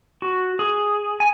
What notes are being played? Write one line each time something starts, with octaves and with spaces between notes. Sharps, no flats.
F#4
G#4
G#5